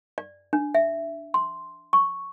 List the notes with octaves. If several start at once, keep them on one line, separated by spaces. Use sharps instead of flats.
D5
D4
E5
C6
C#6